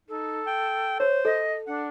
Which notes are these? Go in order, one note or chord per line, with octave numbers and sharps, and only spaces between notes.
D#4 A4
G5
C5 C#5
A4 D#5
D4 F#5